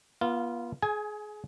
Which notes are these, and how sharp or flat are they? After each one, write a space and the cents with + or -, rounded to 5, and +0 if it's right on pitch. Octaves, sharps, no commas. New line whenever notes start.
B3 -40 F4 -15 F5 +0
G#4 +25 G#5 +0